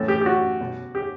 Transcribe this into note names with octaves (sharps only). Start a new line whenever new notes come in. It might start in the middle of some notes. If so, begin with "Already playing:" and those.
Already playing: A2 E3 A4
G4
G4
F#4
B2
G4